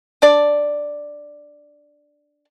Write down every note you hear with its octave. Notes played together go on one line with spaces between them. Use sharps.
D4 D5